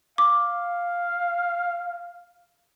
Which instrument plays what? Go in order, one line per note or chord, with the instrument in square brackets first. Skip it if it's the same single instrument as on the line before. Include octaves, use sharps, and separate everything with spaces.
[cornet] F5 [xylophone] D6